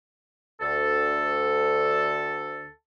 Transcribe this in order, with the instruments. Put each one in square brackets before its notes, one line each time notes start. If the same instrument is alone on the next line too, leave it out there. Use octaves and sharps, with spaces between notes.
[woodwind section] D2 A4